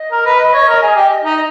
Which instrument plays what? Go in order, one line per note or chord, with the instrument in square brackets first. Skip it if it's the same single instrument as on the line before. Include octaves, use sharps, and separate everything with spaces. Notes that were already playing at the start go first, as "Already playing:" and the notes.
Already playing: [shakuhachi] D#5
[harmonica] A#4
B4
B4
C#5
A#4
G#4
G4
D#4